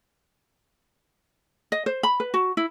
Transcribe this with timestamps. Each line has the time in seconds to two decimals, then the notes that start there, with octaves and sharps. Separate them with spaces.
1.72 D#5
1.86 C5
2.03 B5
2.20 B4
2.34 F#4
2.57 E4